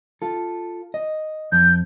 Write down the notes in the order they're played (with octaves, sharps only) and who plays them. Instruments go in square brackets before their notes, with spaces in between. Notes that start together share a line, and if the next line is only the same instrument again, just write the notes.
[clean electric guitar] F4 A4
D#5
[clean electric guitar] F2 [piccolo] G6